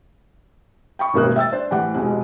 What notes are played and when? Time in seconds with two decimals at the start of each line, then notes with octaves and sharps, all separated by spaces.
0.99 G5 B5 C#6
1.14 E1 A1 D#3 A#3 D#6 F#6
1.36 E5 G5 E6 A6
1.52 D4 C5
1.71 A2 E3 G4 F#5
1.94 F1 B2 G#3